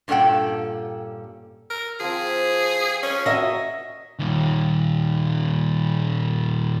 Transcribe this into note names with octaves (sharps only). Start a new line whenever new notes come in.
G2 A#2 C#4 A4 F#5 G5
A#4
F3 C4 G#4
C#4
F#3 D#5 E5
A#2 D#3